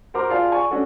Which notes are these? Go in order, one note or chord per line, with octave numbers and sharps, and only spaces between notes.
F#4 A#4 C5 A#5 D6
F4 G#4 D5 F5 A5
D5 G#5 C#6
C#4 D4 F#4 A4